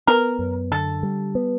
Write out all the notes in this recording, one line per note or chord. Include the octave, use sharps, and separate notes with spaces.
B3 A#4
F#2
D3 A4
G3
B3